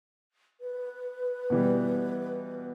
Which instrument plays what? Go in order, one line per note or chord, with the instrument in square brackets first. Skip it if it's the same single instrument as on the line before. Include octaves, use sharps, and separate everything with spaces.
[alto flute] B4
[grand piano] B2 E3 G3